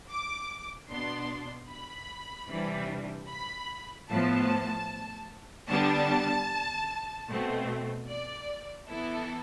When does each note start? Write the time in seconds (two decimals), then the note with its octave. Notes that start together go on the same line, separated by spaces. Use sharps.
0.10 D6
0.89 B2 B3 D4 C6
1.70 B5
2.50 C3 E3 G3 D4
3.29 B5
4.09 A2 F3 B3 A5
5.69 D3 G3 B3 D4 A5
7.28 B2 A3 C4
8.08 D5
8.88 E3 B3 E4 A4